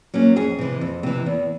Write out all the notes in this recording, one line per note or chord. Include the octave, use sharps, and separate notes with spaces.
F#3 A#3 C#4
F2 G#4
C3 E3
F2
C3 E3
E2